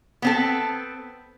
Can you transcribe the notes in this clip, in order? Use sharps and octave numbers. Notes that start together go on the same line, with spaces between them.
B3 C4 A4